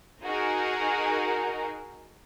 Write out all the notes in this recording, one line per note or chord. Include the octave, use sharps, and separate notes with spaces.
D#4 F#4 G#4 A#4